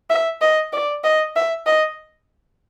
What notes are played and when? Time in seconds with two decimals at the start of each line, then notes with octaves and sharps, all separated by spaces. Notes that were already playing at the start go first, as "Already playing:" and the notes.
0.10 E5
0.41 D#5
0.73 D5
1.04 D#5
1.36 E5
1.66 D#5